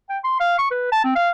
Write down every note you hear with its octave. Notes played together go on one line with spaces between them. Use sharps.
G5
C6
F5
C#6
B4
A5
C4
F5